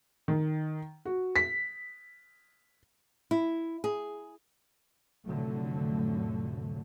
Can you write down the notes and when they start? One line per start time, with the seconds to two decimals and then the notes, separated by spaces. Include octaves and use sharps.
0.28 D#3
1.05 F#4
1.36 B6
3.31 E4
3.84 G#4
5.25 F1 A2 D3 F#3 A3